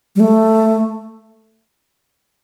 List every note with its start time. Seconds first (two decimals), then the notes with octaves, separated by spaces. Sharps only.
0.16 G3
0.20 A3